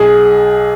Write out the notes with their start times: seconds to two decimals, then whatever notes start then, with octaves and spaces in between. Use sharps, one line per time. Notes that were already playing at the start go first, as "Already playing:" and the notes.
Already playing: B1 G#4